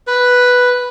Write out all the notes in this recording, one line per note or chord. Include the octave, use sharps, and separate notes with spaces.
B4